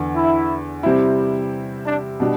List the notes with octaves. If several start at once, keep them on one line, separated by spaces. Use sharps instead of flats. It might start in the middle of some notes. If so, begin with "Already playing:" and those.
Already playing: E2 D3
E4
C3 G3 C4 E4
D4
B2 G3 D4